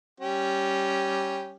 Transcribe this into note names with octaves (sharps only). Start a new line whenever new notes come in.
G3 C#4 G4